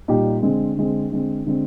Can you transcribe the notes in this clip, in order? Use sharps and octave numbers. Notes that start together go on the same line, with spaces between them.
A#2 G3 A#3 D#4 G4
D3 G#3 C4
D3 G#3 C4
D3 G#3 C4
D3 G#3 C4